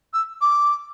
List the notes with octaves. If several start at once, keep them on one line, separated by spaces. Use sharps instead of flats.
E6
D6